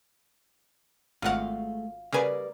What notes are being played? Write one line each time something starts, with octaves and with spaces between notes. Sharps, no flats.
G#1 G#3 A3 F4 F#4 F5 F#5
C#3 G3 A#3 A#4 B4 D5 G#5